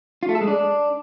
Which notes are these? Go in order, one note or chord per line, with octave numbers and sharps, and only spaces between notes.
F4
A3
A4
G#3
D4